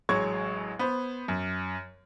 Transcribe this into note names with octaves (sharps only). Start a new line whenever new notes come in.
A1 F#3 G#3 C#6 G#6
B3 C5
F#2